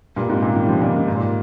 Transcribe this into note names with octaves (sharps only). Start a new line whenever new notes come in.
G2 A#2
G#2 C3
A#2 C#3
C3 D#3
C#3 F3
A#2 C#3
G#2
G#2
A#2